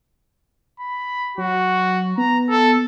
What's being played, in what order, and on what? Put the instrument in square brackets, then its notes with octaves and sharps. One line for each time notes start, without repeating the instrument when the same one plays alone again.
[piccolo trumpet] B5
[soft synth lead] F#3 [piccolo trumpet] F#4
[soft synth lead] B3 [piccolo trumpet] A#5
[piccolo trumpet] A4